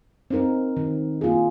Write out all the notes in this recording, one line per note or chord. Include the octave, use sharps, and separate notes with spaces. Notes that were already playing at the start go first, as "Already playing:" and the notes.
C4 D#4 A#4
D#3
A#3 F4 G#4